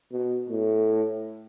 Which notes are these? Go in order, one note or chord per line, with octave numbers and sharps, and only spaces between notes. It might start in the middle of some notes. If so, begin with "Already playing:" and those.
B2
A2